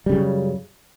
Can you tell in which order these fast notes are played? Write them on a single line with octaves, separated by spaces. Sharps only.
G3 C#3 F#2